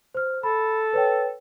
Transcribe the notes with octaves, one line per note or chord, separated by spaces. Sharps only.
C5 F6
A4 B5
B4 C#5 G5